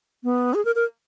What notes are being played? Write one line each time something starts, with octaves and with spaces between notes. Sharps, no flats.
B3
G#4
A#4
A#4